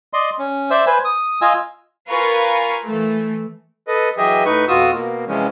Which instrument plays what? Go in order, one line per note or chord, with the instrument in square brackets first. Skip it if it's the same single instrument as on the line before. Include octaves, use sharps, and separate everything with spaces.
[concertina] D5 D#5 C6
C#4
C5 D5 E5 E6
B4 C5 G#5
D#6
F4 D#5 G#5 E6
[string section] F4 A#4 B4 F5 G#5 C#6
E3 A3
[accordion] A4 B4 D#5
E3 F#3 G4 G#4 D#5 E5
A2 D#4 B4 C#6
F2 B2 F4 F#4 D#6 E6
B2 A#3
C3 E3 F3 G#3 C#4